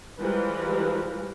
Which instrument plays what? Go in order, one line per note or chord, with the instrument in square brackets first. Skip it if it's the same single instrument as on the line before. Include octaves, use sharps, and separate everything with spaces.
[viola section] E3 F3 G3 G#3 A#4 B4